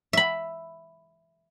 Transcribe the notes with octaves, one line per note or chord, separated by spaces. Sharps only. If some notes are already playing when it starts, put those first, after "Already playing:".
E5 B5